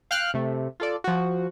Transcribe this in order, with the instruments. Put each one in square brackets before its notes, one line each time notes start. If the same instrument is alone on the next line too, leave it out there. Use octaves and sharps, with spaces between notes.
[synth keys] F5 G5 F6 F#6
C3 A3
F4 A4 D5
F3 F#4